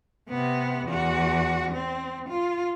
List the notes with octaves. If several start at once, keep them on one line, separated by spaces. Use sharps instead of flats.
C3 B3
E2 F#4
C4
F4